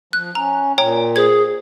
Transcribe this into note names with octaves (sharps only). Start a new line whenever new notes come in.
F3 F#6
C#4 A#5
A#2 C#5 G5 A#5
G#4 C5 G#6